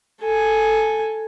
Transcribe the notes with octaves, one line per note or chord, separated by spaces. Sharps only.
A4 G#5